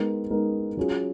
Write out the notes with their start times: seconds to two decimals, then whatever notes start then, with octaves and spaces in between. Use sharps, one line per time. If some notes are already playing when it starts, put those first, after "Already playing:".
Already playing: G#3 B3 D#4 A#4
0.30 G#3 B3 D#4 A#4
0.77 F#3 C#4 F4 G#4